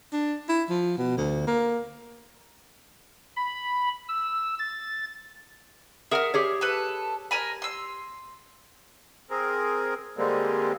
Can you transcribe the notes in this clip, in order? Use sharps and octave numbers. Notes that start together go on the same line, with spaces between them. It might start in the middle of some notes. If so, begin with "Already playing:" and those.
D4
E4
F3
B2
D2
A#3
B5
E6
A6
G#4 A#4 E5 F#5 F6
G4 G#4 C#5
A4 B4
A#4 G#5 B5
C6 E6
C4 G#4 A#4
D3 G3 G#3 A#3 C4